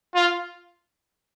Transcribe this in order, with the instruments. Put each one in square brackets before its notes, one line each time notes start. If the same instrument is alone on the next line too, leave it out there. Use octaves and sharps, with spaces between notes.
[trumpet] F4